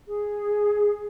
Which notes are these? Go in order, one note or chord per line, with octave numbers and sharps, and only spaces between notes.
G#4